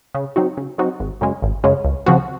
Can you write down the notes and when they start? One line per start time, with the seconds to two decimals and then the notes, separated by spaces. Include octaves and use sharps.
0.15 C#3
0.36 F#3 C4 D#4 F#4
0.57 C#3
0.78 F#3 C4 D#4 F#4
1.00 G#1
1.21 F#2 C#3 G#3 C#4
1.42 G#1
1.64 F#2 C#3 G#3 C#4
1.85 C#2
2.06 C#3 F3 C4 F#4